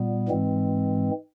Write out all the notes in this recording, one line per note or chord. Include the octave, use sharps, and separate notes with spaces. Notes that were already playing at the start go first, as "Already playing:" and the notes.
Already playing: A#2 G3 B3
G#2 E3 G#3 C4